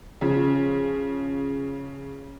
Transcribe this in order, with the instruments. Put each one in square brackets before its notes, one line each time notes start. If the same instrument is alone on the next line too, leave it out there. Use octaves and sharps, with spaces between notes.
[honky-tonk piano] C#3 F3